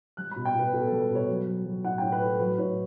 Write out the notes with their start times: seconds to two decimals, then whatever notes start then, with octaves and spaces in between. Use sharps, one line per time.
0.17 G3 F#6
0.31 B2 B5
0.45 G5
0.55 B2 B4
0.73 B2 A4
0.87 G3 A4
1.01 B4
1.11 B2 C#5
1.28 F#3
1.47 F#3
1.65 F#3
1.84 A2 F#5
1.98 A2 G5
2.12 B4
2.21 A2 A4
2.39 F#3 B4
2.58 A2 C#5